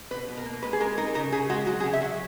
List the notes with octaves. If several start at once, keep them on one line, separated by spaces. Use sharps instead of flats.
B2 B4
B2
A#4
A#3
G#3 B4
G#4
G#3 A#4
D#4 A#4
C#3 A#4
C#3 G#4
G#3 F#4
F#3 F#4
G#4
C#3
E5
F#3